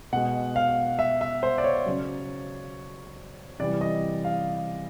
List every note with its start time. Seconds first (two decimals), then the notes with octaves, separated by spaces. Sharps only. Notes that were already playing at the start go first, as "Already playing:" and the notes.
0.12 B2 G#3 F#5
0.56 F5
0.99 E5
1.21 E5
1.43 C5
1.58 D5
1.64 C#5
1.86 C#3 F#3
3.59 C3 E3 G3 D5
3.81 D#5
4.25 F5